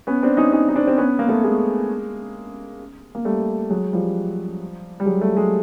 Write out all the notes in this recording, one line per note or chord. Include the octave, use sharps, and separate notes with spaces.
B3 C#4
C4 D4
C#4 D#4
C#4 D#4
D#4
C4 D4
C4
B3 C#4
A#3
A3 B3
G#3 A#3
A#3
G3 A3
F#3 G#3
F3 G3
G3
F#3 G#3
G3 A3
F#3 G#3